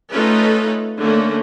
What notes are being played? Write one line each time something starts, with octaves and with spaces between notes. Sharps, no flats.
A3 C#4 D#4 F4 A4 B4
D3 A3 A#3 C#4